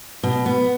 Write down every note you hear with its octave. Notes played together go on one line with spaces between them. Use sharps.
B2
B3